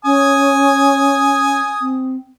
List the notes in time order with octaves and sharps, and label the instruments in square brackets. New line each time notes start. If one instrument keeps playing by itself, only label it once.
[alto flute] C#4 [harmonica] G#5 D#6
[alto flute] C4